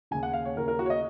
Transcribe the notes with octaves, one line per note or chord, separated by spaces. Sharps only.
D#2 C#3 G#5
F#5
F5
C#5
D#2 C#3 A#4
A#4
F#4
C#5
D#5